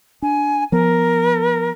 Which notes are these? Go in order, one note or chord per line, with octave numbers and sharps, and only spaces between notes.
D4 G#5
F3 B3 A#4